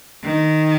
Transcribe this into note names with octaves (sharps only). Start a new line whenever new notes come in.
D#3